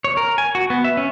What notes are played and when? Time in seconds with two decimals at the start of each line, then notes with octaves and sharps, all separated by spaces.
0.04 C#5
0.17 A#4
0.38 G#5
0.55 F#4
0.70 B3
0.84 E5
0.97 C#4